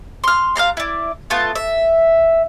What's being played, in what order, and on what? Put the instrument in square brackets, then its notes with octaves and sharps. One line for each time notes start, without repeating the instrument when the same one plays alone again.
[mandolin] C6 F6
F5 G5 A#5 C6
E4 D5
A3 B3 F4 A5
E5